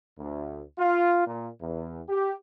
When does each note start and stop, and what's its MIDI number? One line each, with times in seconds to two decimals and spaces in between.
0.19 0.61 38
0.78 1.22 65
1.26 1.49 46
1.61 2.01 40
2.09 2.34 67